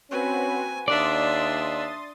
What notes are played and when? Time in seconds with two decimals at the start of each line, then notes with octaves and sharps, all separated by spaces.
0.11 C4 C#4 F#4 B4 G#5
0.88 D#2 D4 D5 E5 C6 D#6 A6